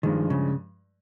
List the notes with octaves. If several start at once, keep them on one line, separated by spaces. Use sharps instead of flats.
G2 D#3 F3 G#3
C#3